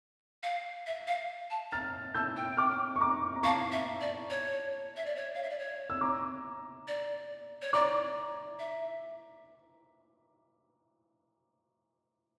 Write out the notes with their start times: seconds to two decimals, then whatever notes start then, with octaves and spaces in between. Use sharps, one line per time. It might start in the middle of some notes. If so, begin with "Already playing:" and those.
0.43 F5
0.87 E5
1.07 F5
1.50 A5
1.71 A#5 F6 A6
2.14 A5 E6 G6
2.37 G5
2.57 D6 F6
2.96 C#6
3.00 A#5 D6
3.36 A#5
3.43 F5 A5 C#6
3.72 E5
4.01 D5
4.30 C#5
4.97 E5
5.06 D5
5.16 C#5
5.35 F5
5.43 E5
5.50 D5
5.59 C#5
5.90 E6
6.01 A#5 D6
6.88 D5
7.62 C#5
7.73 D5 A#5 D6
8.59 E5